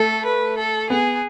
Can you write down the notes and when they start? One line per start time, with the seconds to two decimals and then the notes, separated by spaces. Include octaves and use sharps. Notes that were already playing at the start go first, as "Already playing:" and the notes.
Already playing: A3 A4
0.25 B4
0.58 A4
0.90 B3 G#4